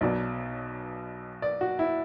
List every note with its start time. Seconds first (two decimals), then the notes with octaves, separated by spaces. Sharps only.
0.01 B1 B2 F#3 D5
1.42 D5
1.61 F#4
1.79 E4